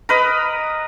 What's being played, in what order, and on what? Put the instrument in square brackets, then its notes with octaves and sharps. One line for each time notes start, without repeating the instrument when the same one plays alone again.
[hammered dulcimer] A#4 B4 D#5